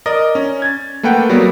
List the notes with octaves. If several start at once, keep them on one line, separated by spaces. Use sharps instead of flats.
A#4 D5 D#5
C#4
G#6 A6
A3 A#3 B4 F#5 G5
F#3 G3 A#3 B3